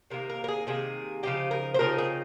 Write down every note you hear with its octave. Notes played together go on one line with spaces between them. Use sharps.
C3 D#3 A#3 A#4
A#4
A#4
G#4
C3 D#3 A#3 G#4
C#3 F3 C4 D#4 G4
A#4
C5
C#3 F3 C4 D#4 A#4
G#4